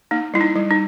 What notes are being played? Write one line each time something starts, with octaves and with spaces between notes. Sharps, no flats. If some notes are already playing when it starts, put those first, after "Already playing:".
A#3 D#4
G3 E4
D#4
G3
D#4